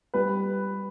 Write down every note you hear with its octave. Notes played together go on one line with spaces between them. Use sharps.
G3 B4